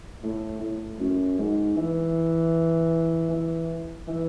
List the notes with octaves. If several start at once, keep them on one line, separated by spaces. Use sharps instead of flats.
A2
A2
F#2
G#2
E3
E3
E3